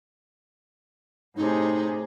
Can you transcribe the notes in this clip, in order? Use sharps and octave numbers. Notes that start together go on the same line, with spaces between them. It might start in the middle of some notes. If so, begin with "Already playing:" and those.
A2 C3 D#4 G#4